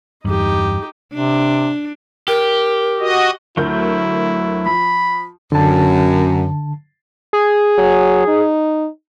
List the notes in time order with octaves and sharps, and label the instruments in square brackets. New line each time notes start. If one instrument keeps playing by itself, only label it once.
[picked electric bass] E2 G2 [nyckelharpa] D#4 G4
[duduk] C3 [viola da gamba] D4
[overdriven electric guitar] G4 [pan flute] A#4
[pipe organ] F#4 D#5
[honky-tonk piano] D2 A#4 G6 [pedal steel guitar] F#3 A3 [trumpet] E4
[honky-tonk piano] F3 [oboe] B5
[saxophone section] F#2 [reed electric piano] D3 A5
[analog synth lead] G#4
[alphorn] F#3
D#4